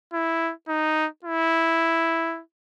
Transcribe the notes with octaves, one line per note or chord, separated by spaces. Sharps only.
E4
D#4
E4